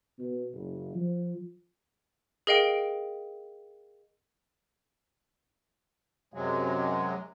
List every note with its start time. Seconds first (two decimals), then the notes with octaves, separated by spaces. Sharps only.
0.19 B2
0.54 F#1
0.94 F3
2.47 G#4 A#4 D#5 F5 G5 D7
6.34 F#2 C3 F#3 G#3